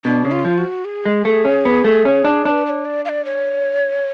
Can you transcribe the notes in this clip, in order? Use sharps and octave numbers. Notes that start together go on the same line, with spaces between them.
B2 D4
C#3
F4
F3
F#4
G#4
G#3
A3
C#4
B3
A3
C#4
D4
D4 B4 C#5
D5
C#5
D5
F5
D5
C#5